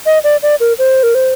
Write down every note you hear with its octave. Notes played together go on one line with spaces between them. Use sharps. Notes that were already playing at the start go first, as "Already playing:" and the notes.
D#5
D5
D5
A#4
C5
A#4
C5